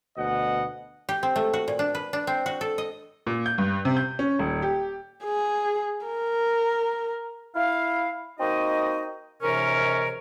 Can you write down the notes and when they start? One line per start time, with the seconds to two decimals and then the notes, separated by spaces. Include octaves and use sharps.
0.18 D2 B2 D#5 F#5
1.09 G4
1.23 C4
1.36 A3
1.53 F#4
1.68 A#2
1.79 D4
1.95 B4
2.13 D4
2.27 C4
2.46 F#4
2.61 A4
2.78 D#5
3.27 A#2
3.46 G6
3.58 G2
3.85 C3
3.97 G6
4.19 C#4
4.39 D#1
4.62 G4
5.24 G#4
6.06 A#4
7.55 E4 F5
8.39 A#3 C4 D#4 F#4 D#5
9.42 D#2 G#2 C3 E3 C#4 A#4